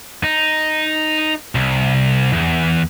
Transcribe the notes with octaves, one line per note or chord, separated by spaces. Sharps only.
D#4
C2
E2